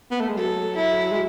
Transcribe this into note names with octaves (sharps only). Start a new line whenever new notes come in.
B3
A3
G#3
F#3 A4
E4
G#3